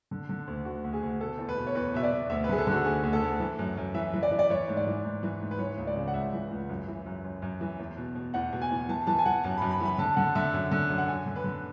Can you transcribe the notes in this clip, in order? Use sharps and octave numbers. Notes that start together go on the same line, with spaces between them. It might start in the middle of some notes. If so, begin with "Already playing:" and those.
D3
D3
D2
D2 F#4
D2
G#4
D2
B2 A4
E2
B4
B2
C#5
E2 B4
B2 E5
D5
B2
D2 E5
B4
D3 G#4
A4
D3 F#4
D2 G#4
D2
A4
D2
E3
F#2
F#2
E3 E5
E3
D5
E3
D5
E3 C#5
G#2
D5
E3
G#2
E3
G#2
B4
E3 C#5
C#2
D5
C#3
F#5
C#2 E5
E3
C#2
F#2
E3
F#2
F#2
F#2
E3
E2
B2
B2
E2 F#5
B2
G#5
E2
E3 A5
E3 A5
G#5
E3 F#5
F#2 A5
F#2 B5
B5
E3
B5
D3 A5
D3 F#5
D3 E5
F#2
D3
F#2
F#5
F#2 G#5
D3
B4
D3